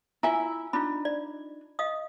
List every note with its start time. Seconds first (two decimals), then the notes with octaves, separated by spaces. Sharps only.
0.23 E4 F4 E5 G#5 A#5
0.73 D4 D#4 F4 B5
1.05 D5
1.79 D#5 F5 D#6